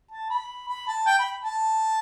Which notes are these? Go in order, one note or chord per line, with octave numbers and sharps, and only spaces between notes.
A5
B5
B5
A5
G5
B5
A5